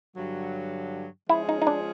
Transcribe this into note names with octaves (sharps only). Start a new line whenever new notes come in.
G2 D3 F#3
F3 G#3 C#4 E4 F4 G#4
D#4
D#4
D4